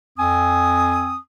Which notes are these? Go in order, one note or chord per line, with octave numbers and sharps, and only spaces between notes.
F2 C4 G#5 D#6